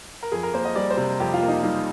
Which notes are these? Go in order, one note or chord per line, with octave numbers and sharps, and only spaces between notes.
A#4
F2 G#4
A#4
A#3 C5
D#5
G3 D5
C5
C3
F2 G4
F4
A#3
D#4
G3 D#4